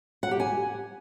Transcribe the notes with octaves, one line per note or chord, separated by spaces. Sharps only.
F#5
G4
G#5